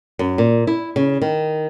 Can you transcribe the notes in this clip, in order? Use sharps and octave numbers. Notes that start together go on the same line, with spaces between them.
F#2
A#2
E4
C#3
D#3